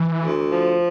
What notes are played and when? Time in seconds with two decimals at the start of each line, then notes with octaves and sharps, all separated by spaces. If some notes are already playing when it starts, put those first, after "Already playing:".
Already playing: E3
0.22 D2
0.50 F3